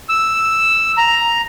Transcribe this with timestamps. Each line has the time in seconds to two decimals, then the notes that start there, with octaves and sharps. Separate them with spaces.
0.09 E6
0.97 A#5